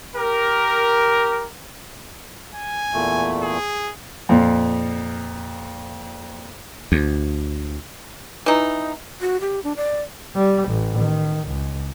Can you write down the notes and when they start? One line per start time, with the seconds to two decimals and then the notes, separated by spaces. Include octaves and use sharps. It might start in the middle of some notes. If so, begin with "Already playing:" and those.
0.16 G4 A#4
2.55 G#5
2.93 E2 A#2 A3
3.42 G#4
4.29 F2 A#2
6.92 D2
8.46 E3 D#4
9.21 F#4
9.41 G4
9.64 D4
9.77 D5
10.36 G3
10.69 A1
10.98 D#3
11.48 C#2